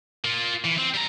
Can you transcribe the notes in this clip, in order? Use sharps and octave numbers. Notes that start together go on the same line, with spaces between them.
A#3 F4
E3
C4
G3 A#5